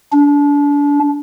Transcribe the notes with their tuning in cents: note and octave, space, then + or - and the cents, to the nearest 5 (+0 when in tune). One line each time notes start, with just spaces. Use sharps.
D4 -30